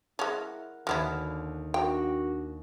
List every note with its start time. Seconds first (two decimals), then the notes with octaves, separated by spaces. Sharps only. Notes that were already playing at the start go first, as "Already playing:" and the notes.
0.19 G#3 C#4 E4 A#4 F#5 A#6
0.87 D#2 D3 F#3 B3 E4 F6
1.74 D4 F#4 A#4 G5